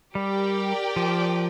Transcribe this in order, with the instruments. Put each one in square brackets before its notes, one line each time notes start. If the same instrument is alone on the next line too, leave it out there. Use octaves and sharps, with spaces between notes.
[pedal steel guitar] G3 [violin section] G4 A#4 D5 G5
[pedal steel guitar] F3